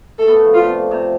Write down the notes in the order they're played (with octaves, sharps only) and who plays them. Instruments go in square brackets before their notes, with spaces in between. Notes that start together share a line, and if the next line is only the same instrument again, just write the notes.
[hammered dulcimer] A3 [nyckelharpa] A4
[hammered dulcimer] B3
A3
F3
[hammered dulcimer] D3 [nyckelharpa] F4
[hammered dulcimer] C3
C3